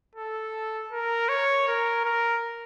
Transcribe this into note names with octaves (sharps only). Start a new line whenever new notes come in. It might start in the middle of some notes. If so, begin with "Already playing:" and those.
A4
A#4
C#5
A#4
A#4